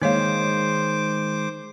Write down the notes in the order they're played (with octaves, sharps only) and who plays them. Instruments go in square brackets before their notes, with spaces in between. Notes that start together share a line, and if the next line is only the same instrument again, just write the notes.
[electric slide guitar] D#3 G#3 [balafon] A#3 C#5 F5 [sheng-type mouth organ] C5 D6